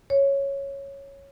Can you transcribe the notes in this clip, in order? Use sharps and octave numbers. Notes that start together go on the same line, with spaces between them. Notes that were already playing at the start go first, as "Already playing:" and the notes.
C#5